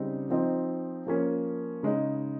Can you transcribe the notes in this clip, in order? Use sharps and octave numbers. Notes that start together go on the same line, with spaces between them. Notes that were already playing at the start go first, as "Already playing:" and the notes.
Already playing: C#3 G3 C4 D#4
F3 C4 D#4
F3 A#3 C#4
C#3 G#3 D#4